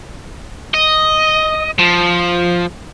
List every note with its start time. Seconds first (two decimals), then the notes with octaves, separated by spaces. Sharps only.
0.74 D#5
1.79 F3